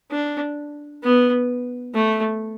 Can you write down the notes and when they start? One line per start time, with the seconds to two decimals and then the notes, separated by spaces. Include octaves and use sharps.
0.11 D4
1.03 B3
1.94 A3